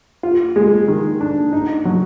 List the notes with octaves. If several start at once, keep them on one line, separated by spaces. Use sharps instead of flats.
F4
G#3
D#3
D4
D#4
F#3